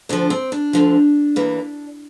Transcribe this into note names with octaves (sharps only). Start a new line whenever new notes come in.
D2 D3 F3 D4
C4
D4
D2 D3 F3
E2 E3 A#3